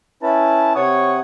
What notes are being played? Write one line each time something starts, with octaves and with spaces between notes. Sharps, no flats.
C#4 E4 B4 A5
C3 C#5 F#5 D#6